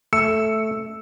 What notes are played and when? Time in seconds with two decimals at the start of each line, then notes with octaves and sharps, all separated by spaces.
0.13 A3 E6 C#7